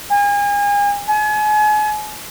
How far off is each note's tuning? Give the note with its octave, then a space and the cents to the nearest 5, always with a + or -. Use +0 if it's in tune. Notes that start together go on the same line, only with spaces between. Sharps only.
G#5 -35
G#5 +35